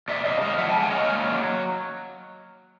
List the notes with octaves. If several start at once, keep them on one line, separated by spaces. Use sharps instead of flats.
A#2 D5 E5
C3 D#5 F5
G#3 D#5 F5
F3 E5 F#5
G5 A5
G#3
F#5 G#5
C#4 D#5 F5
A#3
F#3